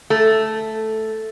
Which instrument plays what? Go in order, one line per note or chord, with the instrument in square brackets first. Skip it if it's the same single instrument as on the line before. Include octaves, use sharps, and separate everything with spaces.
[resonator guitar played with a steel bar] A3